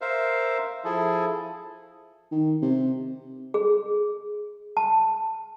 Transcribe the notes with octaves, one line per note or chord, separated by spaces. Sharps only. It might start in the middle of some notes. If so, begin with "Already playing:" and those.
A#4 C5 E5 F5
F3 E4 G#4 A4
D#3
C3
G#4
A5